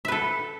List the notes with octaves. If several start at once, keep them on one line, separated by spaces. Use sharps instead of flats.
A4 B4 E5